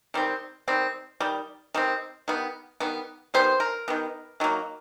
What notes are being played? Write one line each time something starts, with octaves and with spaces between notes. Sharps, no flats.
D#3 G3 C4
D#3 G3 C4
D#3 G3
D#3 G3 C4
D#3 G3 B3
D#3 G3 B3
D#3 G3 B3 C5
A#4
D#3 G3 B3
D#3 F#3 A#3